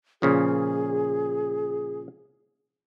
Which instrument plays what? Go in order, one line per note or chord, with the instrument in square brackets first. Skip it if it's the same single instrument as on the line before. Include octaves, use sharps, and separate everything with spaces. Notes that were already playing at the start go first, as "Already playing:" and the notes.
[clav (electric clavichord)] A#2 C#3 F3 [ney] G#4